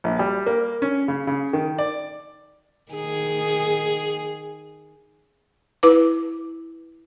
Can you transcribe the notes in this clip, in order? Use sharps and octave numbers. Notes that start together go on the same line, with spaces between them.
A#1
G3
A#3
C#4
C#3
C#3
D#3
D5
D#3 G#4
E4 B4 D6